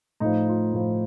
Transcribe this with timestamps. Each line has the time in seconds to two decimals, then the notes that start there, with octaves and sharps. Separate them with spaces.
0.20 A2 F3 D#4
0.48 F4
0.73 A2 F3